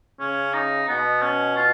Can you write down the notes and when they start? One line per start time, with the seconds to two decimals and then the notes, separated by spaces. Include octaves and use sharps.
0.20 C#3 C#4
0.54 D#4
0.88 B2 B3
1.22 C#4
1.56 F4